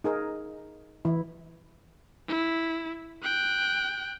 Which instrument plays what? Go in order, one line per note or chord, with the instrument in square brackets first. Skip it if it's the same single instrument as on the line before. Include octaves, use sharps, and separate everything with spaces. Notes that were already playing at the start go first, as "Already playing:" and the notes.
[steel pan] D#4 G#4 A#4
E3 E4
[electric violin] E4
G5 F#6